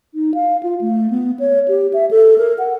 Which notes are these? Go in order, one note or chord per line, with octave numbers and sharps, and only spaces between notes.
D#4
F5
F4
A3
B3
C#5
G4
E5
A4
A#4
F#5